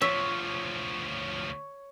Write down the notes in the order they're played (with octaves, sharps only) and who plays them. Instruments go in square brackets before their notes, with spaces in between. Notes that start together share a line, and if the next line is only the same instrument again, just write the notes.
[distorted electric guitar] D2 F3 [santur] C#5 [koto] E5